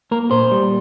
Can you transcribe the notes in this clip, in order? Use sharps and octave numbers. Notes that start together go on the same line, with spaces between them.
A#3 A#4
A#2 C5
G3